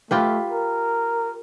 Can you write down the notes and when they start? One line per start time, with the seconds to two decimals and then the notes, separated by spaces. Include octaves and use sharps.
0.11 A3 F4 G4 B4
0.50 A#4